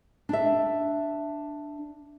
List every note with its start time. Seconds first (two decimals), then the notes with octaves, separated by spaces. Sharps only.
0.29 D4 E5